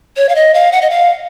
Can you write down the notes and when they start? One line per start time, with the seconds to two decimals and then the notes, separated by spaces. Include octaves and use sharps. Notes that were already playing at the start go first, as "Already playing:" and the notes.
0.17 C#5
0.29 F5
0.35 D#5
0.54 F5
0.72 F#5
0.81 D#5
0.90 F5